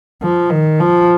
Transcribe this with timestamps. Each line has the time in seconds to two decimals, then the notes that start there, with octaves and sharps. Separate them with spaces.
0.22 F3
0.50 D#3
0.79 F3